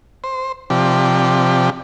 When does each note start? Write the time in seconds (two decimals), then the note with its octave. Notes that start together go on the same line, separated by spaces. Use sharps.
0.24 C5
0.70 C3 F3 G4 D5